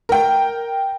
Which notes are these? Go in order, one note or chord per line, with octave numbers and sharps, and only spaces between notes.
A#4 G5